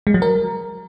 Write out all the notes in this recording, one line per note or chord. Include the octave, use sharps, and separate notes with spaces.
G#3
F#3
A#4